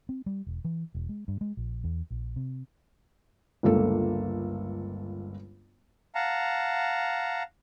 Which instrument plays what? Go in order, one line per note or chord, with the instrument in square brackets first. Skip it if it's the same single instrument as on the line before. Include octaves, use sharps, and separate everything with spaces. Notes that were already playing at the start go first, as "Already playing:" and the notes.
[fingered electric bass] C4
G3
E1
E3
E1
G#3
G2
G#3
A#1
E2
A#1
C3
[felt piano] G1 C#2 A#3 A4
[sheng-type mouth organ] F5 F#5 A5 A#5